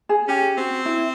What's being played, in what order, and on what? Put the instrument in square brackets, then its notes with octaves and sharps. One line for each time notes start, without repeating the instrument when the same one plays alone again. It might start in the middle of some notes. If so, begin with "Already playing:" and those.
[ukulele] G#4
[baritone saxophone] C#4 [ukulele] G4
[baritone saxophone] C4 [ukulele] F#4
[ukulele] E4